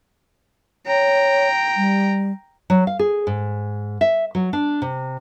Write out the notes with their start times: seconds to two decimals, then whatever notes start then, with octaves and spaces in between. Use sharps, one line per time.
0.86 C#5 G5 A#5
1.77 G3
2.70 F#3
2.87 F5
2.99 G#4
3.27 G#2
4.01 E5
4.35 F#3
4.53 D4
4.82 C3